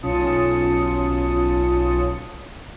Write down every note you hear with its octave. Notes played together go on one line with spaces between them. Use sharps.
B1 C#4 F4 A5 D#6 C#7